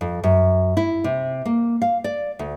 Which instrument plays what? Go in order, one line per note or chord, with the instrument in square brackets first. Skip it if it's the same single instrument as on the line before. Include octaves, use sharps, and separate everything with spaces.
[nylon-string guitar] F2
F#2
E4
C3
A#3
F5
D5
D2